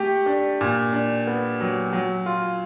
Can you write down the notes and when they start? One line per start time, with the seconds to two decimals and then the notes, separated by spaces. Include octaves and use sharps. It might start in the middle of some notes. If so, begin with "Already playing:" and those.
Already playing: A3 G4
0.26 D4
0.61 A#2
0.93 D4
1.27 B3
1.61 F#3
1.93 F#3
2.26 F4